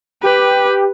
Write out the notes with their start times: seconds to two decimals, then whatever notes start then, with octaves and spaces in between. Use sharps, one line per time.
0.23 G4 B4